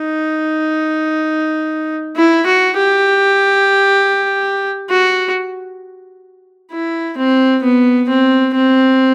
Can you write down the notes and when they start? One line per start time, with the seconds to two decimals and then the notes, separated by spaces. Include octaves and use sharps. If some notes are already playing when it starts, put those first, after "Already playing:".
Already playing: D#4
2.17 E4
2.46 F#4
2.77 G4
4.90 F#4
6.72 E4
7.18 C4
7.63 B3
8.09 C4
8.54 C4